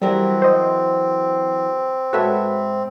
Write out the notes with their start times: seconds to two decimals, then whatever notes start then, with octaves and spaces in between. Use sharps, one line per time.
0.02 E3 F#3 G3 C4 A#4
0.42 C5 D#5
2.13 G#2 F#4 A4 B4 C#5 E5